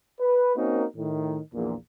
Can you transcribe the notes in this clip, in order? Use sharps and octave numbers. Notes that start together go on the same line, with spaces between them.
B4
A#3 C4 C#4 D#4 F#4 A#4
A2 D#3
A#1 E2 A#2